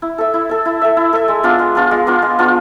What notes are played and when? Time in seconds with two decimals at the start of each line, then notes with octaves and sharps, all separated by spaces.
0.02 E4
0.18 A4 E5
0.34 E4
0.49 A4 E5
0.65 E4
0.82 A4 E5
0.97 E4
1.13 A4 E5
1.28 G#3
1.43 B3 D4 F4
1.59 G#3
1.75 B3 D4 F4
1.91 G#3
2.07 B3 D4 F4
2.22 G#3
2.39 B3 D4 F4